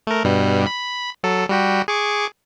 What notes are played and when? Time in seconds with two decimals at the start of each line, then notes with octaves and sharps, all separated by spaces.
0.07 A3 A#4
0.24 G2 B2 G3
0.66 B5
1.23 F#3 A4
1.49 G3 F#4 G4
1.88 G#4 C#6 D6